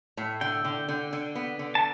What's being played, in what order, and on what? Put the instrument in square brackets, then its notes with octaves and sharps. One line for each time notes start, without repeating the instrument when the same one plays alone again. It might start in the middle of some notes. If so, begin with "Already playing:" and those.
[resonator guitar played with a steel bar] A2
[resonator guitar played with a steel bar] D3 [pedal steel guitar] G5
[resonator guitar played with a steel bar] D3
D3
D3
B3
D3
[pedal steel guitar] A5